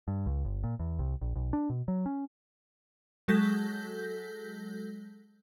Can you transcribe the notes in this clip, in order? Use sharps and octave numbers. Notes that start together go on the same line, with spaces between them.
G2
C#2
G1
A#2
E2
C2
A#1
B1
D4
B2
F#3
C#4
F#3 G#3 A4 G6 A#6 B6